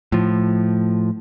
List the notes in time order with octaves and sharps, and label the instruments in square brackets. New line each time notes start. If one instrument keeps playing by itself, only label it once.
[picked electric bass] A2 F3